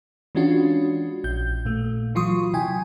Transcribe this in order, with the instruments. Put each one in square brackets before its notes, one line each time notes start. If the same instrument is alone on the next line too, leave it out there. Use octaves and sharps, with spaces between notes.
[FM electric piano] E3 G#3 C#4 D4 F4 F#4
A#1 G6
A#2 A3
E3 F#3 F4 C6 C#6 D#6
C3 E4 G5 G#5